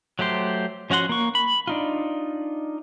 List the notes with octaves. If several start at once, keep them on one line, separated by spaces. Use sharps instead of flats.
F#3 A3 G4 C5
F3 C#4 F#4 F#5 C6
A#3 C#6
B5
D4 D#4 F4